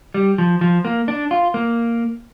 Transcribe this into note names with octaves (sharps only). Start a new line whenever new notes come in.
G3
F3
F3
A#3
D4
F4
A#3